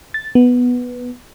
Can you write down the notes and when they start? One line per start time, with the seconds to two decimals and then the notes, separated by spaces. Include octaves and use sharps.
0.14 A6
0.35 B3